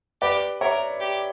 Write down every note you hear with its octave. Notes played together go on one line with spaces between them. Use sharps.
G4 B4 D5
A#4 C#5 E5
G4